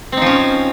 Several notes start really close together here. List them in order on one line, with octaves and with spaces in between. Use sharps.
C4 D#4 F3 C#4